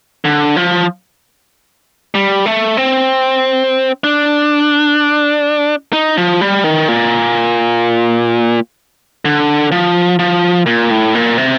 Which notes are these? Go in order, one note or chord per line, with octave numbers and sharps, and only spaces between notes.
D3
F3
G3
A3
C4
D4
D#4
F3
G3
D#3
A#2
D3
F3
F3
A#2
A2
A#2
C3